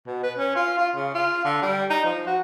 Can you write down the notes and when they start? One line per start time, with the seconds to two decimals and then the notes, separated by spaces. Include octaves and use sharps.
0.07 B2
0.23 B4
0.38 C#4
0.56 F4
0.78 F4
0.96 C#3
1.14 F4
1.44 D3
1.62 G3
1.90 D#4
2.05 F3
2.26 F#4